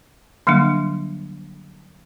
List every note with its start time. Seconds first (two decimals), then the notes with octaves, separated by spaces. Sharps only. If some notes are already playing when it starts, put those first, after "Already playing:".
0.47 D3 F#3 G3 A#3 D4